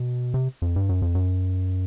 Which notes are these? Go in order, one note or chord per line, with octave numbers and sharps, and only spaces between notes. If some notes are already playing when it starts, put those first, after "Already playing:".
Already playing: B2
C3
F2
G2
F#2
F2
F#2